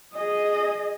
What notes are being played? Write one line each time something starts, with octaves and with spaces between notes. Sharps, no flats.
G#4 D#5